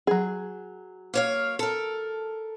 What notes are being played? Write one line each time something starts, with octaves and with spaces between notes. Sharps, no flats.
F#3 G#4
A#3 C#5 F5
A4 A#4